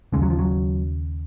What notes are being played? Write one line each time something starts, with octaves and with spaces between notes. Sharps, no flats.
D#2 C#3 G#3
F#3
F3
F#3